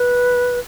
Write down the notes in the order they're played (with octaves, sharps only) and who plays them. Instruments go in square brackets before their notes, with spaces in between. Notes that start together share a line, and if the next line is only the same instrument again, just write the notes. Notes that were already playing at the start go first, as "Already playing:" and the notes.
Already playing: [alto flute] B4